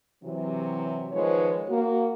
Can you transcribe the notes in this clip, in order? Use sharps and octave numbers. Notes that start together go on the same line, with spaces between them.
C3 E3 F#3
D#3 F3 G#3 B4 C#5
A#3 F#4